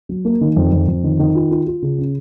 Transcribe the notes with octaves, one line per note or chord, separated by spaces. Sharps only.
F#3
A#3
D#3
F2
F2
F2
D#3
D#3
F4
F4
F4
C#3
C#4